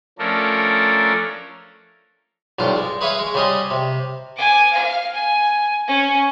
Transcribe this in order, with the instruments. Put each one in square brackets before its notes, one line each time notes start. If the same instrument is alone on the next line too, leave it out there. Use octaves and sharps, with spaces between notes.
[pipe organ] F3 A3 C#4 D4 A4 A#4
[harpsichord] B1 G2 F4 C5
G#3
G#4 B4 C#5 E5 F5 G#5
G#3
C#3 G3 C#4 G#4 C5 D#5
C3
[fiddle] G#5 D6
F5
G#5
C#4